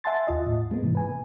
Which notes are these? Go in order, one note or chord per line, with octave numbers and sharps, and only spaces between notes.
E5 F#5 G#5 A5 C6 A6
D#2 F4 D#5
A2
G#3 A#3 B3
G#2 C3 E3
B4 G#5